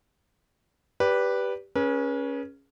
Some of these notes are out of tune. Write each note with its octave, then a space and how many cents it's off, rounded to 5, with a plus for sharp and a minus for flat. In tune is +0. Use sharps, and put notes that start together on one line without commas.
G4 +0 B4 -10 D5 -30
C#4 +0 G#4 +0 B4 -40